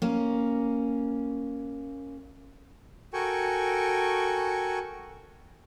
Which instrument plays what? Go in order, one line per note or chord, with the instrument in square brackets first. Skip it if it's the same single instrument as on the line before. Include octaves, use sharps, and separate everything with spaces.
[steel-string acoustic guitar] A#3 C#4
[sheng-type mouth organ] F#4 A4 A#4 G5 G#5 C#6